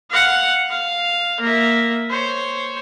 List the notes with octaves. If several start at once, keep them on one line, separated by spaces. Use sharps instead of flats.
F5 F#5
F5
A#3 E5
C5 C#5